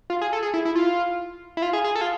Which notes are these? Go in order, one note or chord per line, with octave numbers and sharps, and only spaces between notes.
F4
G#4
A4
G#4
E4
E4
F4
E4
F4
G#4
G#4
A4
F4